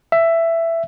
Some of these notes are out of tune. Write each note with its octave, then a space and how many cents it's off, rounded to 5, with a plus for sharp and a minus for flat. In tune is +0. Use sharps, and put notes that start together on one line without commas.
E5 +10